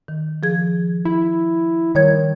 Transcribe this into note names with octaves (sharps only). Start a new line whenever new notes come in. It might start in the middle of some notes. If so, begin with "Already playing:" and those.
D#3
F3 G#4 G#6
E4
D#3 G3 C#5 G#6